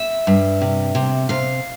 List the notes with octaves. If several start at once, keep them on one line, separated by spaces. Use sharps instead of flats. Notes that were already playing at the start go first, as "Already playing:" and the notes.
Already playing: E5
G2
C3
C3
C3 F5